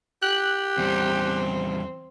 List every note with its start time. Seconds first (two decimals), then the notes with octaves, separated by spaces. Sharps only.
0.23 G4 F#6
0.78 E2 G3 C4